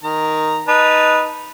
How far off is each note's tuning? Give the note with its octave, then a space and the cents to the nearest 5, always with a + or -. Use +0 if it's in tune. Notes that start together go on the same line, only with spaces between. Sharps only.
D#3 +0 A#5 -5
D#4 +0 B4 -10 A5 +0